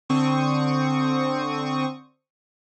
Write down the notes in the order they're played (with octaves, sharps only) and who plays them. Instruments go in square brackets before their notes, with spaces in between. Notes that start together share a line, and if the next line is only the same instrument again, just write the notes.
[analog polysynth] D3 C4 C#6 D#6